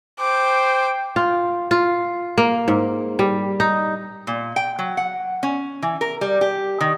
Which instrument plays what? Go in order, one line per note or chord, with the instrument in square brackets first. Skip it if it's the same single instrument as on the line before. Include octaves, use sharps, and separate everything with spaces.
[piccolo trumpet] C5 [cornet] G5 [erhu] D6
[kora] F4
F4
A#3
G#2
G3
D#4
[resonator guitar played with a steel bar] A#2
G5
F#3
F#5
C#4
E3
A#4
G3
G4
D#3